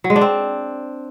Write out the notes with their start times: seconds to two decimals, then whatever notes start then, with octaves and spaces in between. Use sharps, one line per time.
0.04 F#3
0.10 G#3
0.16 D4
0.21 C4